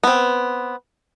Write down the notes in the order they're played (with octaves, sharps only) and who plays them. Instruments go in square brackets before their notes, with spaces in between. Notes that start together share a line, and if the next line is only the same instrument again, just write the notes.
[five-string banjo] B3 C4